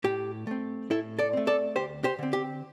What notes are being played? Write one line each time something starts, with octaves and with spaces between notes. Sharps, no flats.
A2 G4
A3 C4
A2 E4 A4
A4 D5
A3 C4
A4 D5
D2 G4 C5
G4 C5
D3 C4
G4